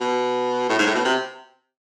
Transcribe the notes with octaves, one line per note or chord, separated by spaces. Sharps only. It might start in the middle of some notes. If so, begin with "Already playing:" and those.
B2
A2
G#2
A2
B2
C3